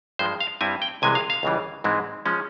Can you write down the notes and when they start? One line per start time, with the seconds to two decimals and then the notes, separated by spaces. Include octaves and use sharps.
0.19 G2 F3 G#3 C5
0.40 F5
0.61 G2 G3 C4 E4 G#5
0.82 G5
1.02 C2 C3 E3 G#3 G#5
1.15 F5
1.30 F5
1.43 C#2 C#3 E3 G3
1.84 G#2 E3 G#3 C4 E4
2.26 F3 G#3 C#4